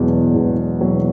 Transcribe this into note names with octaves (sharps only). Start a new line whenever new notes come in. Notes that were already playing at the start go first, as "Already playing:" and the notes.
Already playing: E1 E2 B2 F#3
E1
E2 B2 F#3